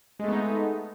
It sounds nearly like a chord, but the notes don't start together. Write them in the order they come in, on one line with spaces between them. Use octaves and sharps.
G#3 A3 B3 D#4